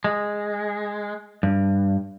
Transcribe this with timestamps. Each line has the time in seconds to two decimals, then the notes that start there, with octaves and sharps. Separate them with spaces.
0.04 G#3
1.43 G2